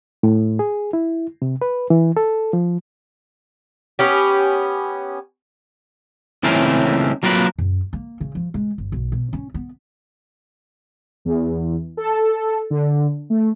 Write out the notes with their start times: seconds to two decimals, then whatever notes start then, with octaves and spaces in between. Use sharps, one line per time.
0.23 A2
0.59 G#4
0.93 E4
1.42 C3
1.62 B4
1.90 E3
2.17 A4
2.53 F3
3.99 B3 C#4 G4
6.43 C#2 E3 A3 C4 C#4 A#4
7.23 F#3 A#3 F4 A#4 B4
7.59 F#2
7.93 A#3
8.20 C#3
8.35 F3
8.54 G#3
8.78 G1
8.92 B1
9.12 B2
9.33 C#4
9.54 B3
11.25 E2
11.97 A4
12.70 D3
13.30 A3